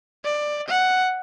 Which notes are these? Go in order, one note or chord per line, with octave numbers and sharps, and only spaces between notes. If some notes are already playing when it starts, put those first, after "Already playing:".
D5
F#5